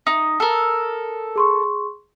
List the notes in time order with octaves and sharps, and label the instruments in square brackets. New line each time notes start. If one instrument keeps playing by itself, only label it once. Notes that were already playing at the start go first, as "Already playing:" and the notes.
[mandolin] D#4 [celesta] D#6
[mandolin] A4 A#4
[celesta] G#4 C6 C#6